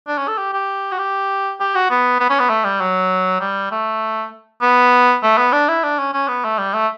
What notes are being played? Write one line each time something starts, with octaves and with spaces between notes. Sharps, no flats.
D4
C#4
A4
G4
G4
F#4
G4
G4
F#4
B3
B3
C#4
B3
A3
G3
F#3
G3
A3
B3
A3
B3
D4
E4
D4
C#4
C#4
B3
A3
G3
A3